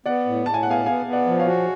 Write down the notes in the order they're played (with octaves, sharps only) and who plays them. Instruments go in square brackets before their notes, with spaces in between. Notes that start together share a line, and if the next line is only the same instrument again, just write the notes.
[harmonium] B3 [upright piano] D5 F#5
[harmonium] A2
[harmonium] A2 [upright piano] A5
[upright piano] G#5
F#5
[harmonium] B3 [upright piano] F5 G#5
[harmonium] B3 [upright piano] F5 G#5
[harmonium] B3
[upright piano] D5 F#5
[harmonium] F3
[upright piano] C#5 F5
[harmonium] F#4